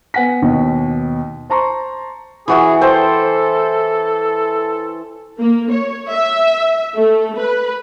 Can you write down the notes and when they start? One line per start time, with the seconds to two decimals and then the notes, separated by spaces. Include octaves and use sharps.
0.14 B3 F#5 G#5 B6
0.42 D#2 B2
1.50 C5 A5 A#5 C6 C#6
2.48 E3 F#4 G#4 E5
2.81 A4 C5 E5 G5
5.39 A#3
5.71 C#5
6.10 E5
6.95 A3
7.38 B4